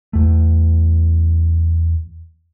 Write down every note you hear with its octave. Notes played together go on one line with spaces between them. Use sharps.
E2 A3